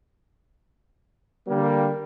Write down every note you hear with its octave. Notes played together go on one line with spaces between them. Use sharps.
D3 G3 A#3